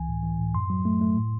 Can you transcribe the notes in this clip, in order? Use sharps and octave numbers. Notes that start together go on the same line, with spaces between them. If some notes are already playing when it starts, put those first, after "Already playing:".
Already playing: C#2 E3 G#5
A2
E3
A2
F#2 C6
F#3
A3
A3
A2